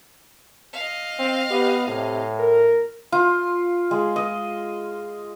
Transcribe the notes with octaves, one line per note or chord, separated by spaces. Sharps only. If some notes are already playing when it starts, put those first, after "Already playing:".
D#5 F5
C4
B3 G4
A2 C3
A#4
F4
G#3
D#5